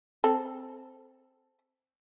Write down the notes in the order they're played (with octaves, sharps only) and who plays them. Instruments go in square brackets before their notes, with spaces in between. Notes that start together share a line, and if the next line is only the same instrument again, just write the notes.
[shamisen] C4 A4